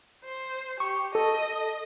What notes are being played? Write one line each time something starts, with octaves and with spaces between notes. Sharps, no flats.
C5
G4 C#6
A4 D#5